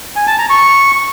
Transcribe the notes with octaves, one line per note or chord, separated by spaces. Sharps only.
G#5
A5
A#5
C#6